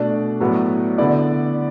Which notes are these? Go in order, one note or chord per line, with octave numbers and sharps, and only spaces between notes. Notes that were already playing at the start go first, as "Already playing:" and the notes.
Already playing: B2 A3 D4 D5
A2 F#3 B3
D3 B3 E4 D5